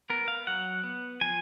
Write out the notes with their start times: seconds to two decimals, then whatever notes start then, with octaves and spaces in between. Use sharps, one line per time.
0.10 B3 A#4
0.28 F5
0.47 F#3 F#5
0.84 B3
1.21 F3 G#5